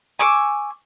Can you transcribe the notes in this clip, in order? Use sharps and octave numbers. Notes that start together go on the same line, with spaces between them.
G#5 C#6 D6 E6